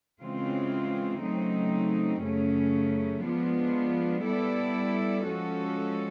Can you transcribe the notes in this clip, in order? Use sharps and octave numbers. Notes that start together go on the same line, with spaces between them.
C#3 E3 G#3 C4 F4
C#3 F#3 A3 C4 D#4
F#2 C#3 F#3 A3 C#4
F3 G#3 B3 D4 F4
G3 B3 E4 A4 D5
F3 G#3 C#4 F#4 A4